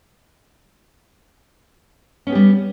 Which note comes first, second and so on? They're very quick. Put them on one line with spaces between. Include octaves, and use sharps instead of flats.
C#4 B3 G4 G3